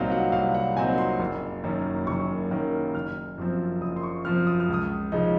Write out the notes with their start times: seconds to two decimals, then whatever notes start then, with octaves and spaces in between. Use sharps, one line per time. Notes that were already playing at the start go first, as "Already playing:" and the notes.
Already playing: C2 A#2 F#3 C4 D#4 D#5 F5
0.12 F#5
0.32 C2 F5
0.54 F#5
0.77 A#2 F#3 C4 D#4 G#5
0.98 C6
1.19 F#1
1.64 F#2 D#3 A#3 C#4
2.07 F#1 C#6
2.51 F#2 D#3 A#3 C#4
2.94 F#1 F6
3.38 F#2 F3 C4
3.81 F#1 D#6
3.97 C6
4.03 C#6
4.25 F#2 F3 C4 F6
4.47 D#6
4.60 F6
4.69 C#2
4.74 D#6
5.12 C#3 F3 G#3 D#4